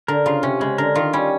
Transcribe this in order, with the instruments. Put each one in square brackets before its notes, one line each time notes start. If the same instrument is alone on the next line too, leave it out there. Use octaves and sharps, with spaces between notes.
[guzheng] D3 [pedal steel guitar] A#4
[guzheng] C#3 [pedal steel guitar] F4
[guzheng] C3 [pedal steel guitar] C#4
[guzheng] C#3 [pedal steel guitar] G#3
[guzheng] D3 [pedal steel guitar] A#4
[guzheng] D#3 [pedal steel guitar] F4
[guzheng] G3 [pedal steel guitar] C#4